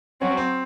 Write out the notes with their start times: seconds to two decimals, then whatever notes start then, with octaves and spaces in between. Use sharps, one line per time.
0.20 F#3 C4 C#4 F#4
0.37 C4